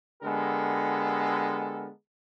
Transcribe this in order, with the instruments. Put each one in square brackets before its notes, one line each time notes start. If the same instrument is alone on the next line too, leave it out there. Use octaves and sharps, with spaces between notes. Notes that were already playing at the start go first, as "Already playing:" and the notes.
[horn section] D3 G#3 B3 G4 A4 A#4